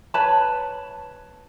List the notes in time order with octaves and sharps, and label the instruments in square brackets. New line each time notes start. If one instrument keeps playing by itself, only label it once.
[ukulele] B4 C#5 A5 B5